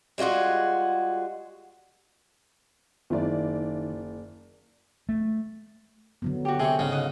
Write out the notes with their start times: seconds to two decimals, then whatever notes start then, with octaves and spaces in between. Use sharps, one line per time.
0.18 G3 G#3 F4 F#4 G#4
3.10 F#1 D#3 D#4 E4 D5
5.09 A3
6.22 D3 F#3 B3
6.45 F#4 G4
6.60 C3 G#4 G5 C#6
6.79 G#2 C#3
6.92 D#5 F5 F#5